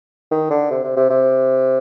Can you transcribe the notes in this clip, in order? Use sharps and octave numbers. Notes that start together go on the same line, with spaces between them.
D#3
D3
C3
C3
C3
C3